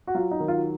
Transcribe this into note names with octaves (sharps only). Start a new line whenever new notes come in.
F#4
F#3 F4
D#4
D#3
F4